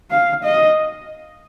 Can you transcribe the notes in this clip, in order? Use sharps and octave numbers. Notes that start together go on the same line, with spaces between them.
F5
D#5